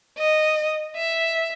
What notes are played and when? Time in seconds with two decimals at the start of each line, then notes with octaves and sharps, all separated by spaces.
0.18 D#5
0.97 E5